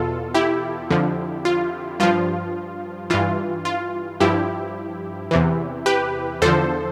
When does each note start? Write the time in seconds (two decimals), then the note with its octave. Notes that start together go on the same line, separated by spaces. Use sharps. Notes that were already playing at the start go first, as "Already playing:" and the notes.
Already playing: E2 B2 F4 A4
0.34 E4 G4
0.90 F2 D3 F3
1.45 F4
2.00 G2 F3 F4
3.10 G2 E3 F4
3.65 F4
4.20 G2 F3 E4 G4
5.31 E2 C3 E3
5.86 G4 B4
6.42 E2 D3 F3 A4 C5